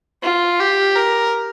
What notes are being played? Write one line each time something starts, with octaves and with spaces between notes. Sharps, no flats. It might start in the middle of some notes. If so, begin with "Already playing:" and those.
F4
G4
A#4